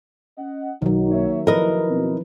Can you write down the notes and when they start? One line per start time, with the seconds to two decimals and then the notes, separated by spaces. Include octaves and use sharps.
0.38 C#4 D#5 F#5
0.82 B1 D#3 F#3 D#4
1.12 A#3 C#5 E5
1.47 F#1 F3 E4 A#4 B4 D#5
1.89 B2 C4